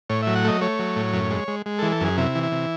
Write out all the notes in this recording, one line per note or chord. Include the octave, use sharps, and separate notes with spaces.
A2 C#5
F#3 E5
F#5
A3 D#5
A3 C#5
F#3
A2
F#2
G#3
G#3
G#3
E3 A4
A4
F#2 G#4
C3 E4
E3
E4
C3